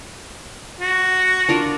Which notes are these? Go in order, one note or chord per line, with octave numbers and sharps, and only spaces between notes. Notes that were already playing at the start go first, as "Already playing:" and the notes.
F#4
D4 F4 A#4